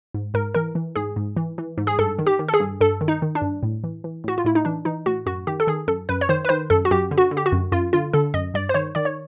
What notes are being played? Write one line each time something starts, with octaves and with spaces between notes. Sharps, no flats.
G#2
G#2 A#4
E3 A#4
E3
G#2 G#4
G#2
E3
E3
G#2
G#4
G2 A4
D#3
G4
D#3
A4
G#4
G2
G2 A4
D#3
D#4
D#3
D4
G2
A2
E3
E3
A2 F#4
F4
A2 E4
D#4
E3 D4
E3 D#4
A2 F#4
F#2 F#4
D#3 G4
A4
D#3 G#4
F#2 A4
F#2 B4
C#5
D#3 C5
B4
D#3 C5
F#2 A4
F#4
F#2 G4
D3
F#4
D3
G4
F#4
F#2
F#2 F4
D3 F4
D3 A4
F#2 D#5
G2 D5
C5
D#3 C#5
D#3 D5
C#5